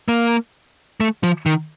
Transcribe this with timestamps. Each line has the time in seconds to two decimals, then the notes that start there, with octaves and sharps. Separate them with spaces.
0.08 A#3
1.00 A3
1.23 F3
1.46 D#3